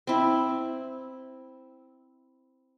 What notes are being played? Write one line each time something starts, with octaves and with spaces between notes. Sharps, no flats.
C4 E4